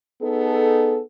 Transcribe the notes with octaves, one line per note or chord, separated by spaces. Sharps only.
B3 D#4 G#4 A4